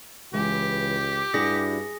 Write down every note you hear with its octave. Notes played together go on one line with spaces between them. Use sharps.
C#2 E3 G#3 G4 B4
G2 D4 E4 F#4 G#4 A#6